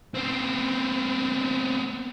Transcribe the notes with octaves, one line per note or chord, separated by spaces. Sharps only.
B3 C4